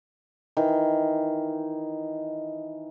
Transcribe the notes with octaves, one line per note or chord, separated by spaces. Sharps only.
D#3 E3